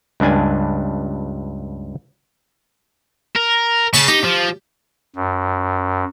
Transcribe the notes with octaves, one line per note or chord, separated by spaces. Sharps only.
C#2 G2 D4 G#5
A#4
C#3 A5 B5 C#6
D#4 G4
F3
F#2